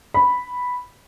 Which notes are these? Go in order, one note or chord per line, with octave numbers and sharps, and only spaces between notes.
B5